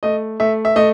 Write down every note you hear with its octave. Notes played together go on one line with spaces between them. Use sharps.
A3 D#5
A3 E5
E5
A3 D#5